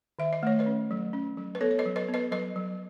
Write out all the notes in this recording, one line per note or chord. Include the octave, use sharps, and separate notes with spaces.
D#3 E5
D#5
A3 C#5
B4 D#5
C#4
F#3
C#4
F#3
B4
B3 A4 C#5
C#5
B4 D#5
F#3
B4 D#5
B3
B4 D#5
F#3 B4 D#5
F#3